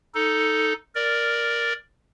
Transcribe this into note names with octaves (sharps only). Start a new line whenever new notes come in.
D#4 A4
A#4 D5